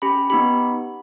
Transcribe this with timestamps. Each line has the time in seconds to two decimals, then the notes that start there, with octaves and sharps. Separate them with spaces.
0.02 C#4 G4 B5
0.30 B3 D#4 G4 B5